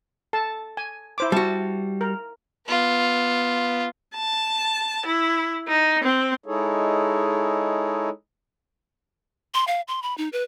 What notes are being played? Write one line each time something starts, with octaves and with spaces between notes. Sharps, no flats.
A4 A5
G#5
E4 C5 D6
G3 F#4 A5
A#4
B3 F4
A5
E4
D#4
C4
G#3 D#4 E4 G#4 A4 C#5
C6
F5
C6
B5
D#4
B4